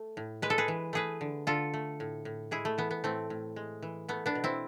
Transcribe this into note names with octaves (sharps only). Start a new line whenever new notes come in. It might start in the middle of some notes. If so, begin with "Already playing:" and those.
Already playing: A3
A2
G#3 B4
A4
G#4 B4
E3
A3 G#4 B4
D3
D3 F4 A4
A3
A2
A2
G#3 E4 G#4
A3
E3 B3
B3
A2 A3 C4
A2
G#3
E3
A3 B3
B3 D4
B2
C4 E4